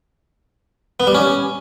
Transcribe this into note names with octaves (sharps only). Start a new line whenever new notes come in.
B3
G3
C#4